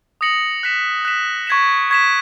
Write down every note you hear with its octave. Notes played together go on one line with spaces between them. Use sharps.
D#6 A#6 C#7 F#7
F#6 B6 E7
F#6 B6 E7
C#6 G#6 B6 E7
C#6 G#6 B6 E7